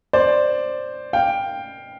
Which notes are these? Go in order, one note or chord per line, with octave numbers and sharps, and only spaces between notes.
C5 D5
F5 G5